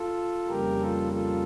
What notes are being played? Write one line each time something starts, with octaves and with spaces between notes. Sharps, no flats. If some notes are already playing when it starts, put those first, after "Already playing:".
Already playing: F4 A4
F2 C#3 G3 A#3 G4 A#4
F4 A4
F4 A4